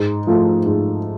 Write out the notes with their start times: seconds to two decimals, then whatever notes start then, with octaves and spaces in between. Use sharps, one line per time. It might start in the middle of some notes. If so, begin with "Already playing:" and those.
Already playing: G#2
0.27 F3 A3 F4 A4
0.66 G#2